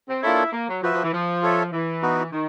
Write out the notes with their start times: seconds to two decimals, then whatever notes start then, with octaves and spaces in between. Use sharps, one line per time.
0.08 C4
0.23 A#3 D4 E4 F4 A4 C#5
0.52 A#3
0.68 F#3
0.82 F3 F#4 B4 E5
0.93 F3
1.03 E3
1.12 F3
1.42 F4 A4 C#5 E5
1.73 E3
2.02 B3 D#4 F#4
2.32 D#3